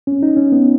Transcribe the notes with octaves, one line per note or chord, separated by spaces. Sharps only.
C#4
D#4
C#4
B3